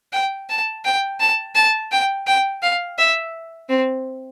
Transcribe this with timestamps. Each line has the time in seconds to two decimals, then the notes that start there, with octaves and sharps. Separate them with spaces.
0.13 G5
0.49 A5
0.85 G5
1.20 A5
1.55 A5
1.92 G5
2.27 G5
2.62 F5
2.98 E5
3.69 C4